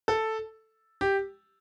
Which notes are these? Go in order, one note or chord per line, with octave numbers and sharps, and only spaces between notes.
A4
G4